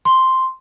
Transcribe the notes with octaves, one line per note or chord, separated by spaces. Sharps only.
C6